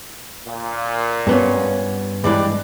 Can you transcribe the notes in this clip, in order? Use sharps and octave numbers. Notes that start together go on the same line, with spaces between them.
A#2
G2 B3 C#4
G2 E3 G#3 G4 B4 D5